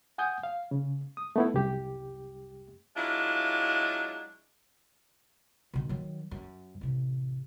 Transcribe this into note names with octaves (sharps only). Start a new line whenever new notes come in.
F#5 G#5 D#6 G6
F5
C#3
D#6
A3 B3 E4
C2 F#2 G4
F#3 G#3 D4 E4 F4
B2 D#3
D#3 F#3
F#2
A1 C3